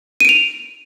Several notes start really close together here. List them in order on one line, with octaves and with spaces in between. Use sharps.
D#7 D7 F7